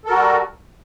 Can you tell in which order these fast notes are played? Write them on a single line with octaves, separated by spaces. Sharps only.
A4 A#4 F#4 G3